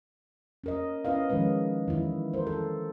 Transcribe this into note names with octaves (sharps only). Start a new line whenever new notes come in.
C#4 A#4 D#5
C#4 E4 B4 D#5 F5
D#3 F3 G#3 C#4 B4
D#3 E3 E4
A#4 C5
A4